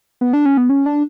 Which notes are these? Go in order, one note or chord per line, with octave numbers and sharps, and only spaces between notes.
B3
D4
C#4
B3
C#4
D4